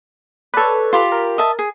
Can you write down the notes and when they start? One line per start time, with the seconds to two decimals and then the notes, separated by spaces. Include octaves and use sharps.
0.54 A4 B4 C#5 D5
0.93 F4 G4 B5
1.12 A#4
1.38 D#5 E5 A5
1.59 G#4